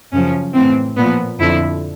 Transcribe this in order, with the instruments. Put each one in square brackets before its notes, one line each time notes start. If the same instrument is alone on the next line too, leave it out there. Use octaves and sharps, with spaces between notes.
[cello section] F#2 C#3 F3 C#4
A2 E3 C4
A#2 F3 B3
F2 D3 F3 E4